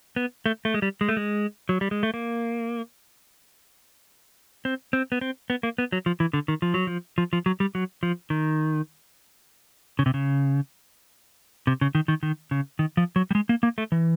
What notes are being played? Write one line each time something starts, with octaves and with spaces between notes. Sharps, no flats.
B3
A3
A3
G#3
G3
G#3
A3
G#3
F#3
G3
G#3
A3
A#3
C4
C4
B3
C4
B3
A#3
B3
F#3
F3
E3
D3
D#3
F3
F#3
F3
F3
F3
F#3
G3
F#3
F3
D#3
C#3
C3
C#3
C3
C#3
D#3
D#3
D#3
C#3
D#3
F3
F#3
G3
G#3
A#3
A#3
A3
E3